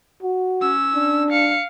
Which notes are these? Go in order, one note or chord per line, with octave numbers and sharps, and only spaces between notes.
F#4
C#4 E6
D4
F5 C#7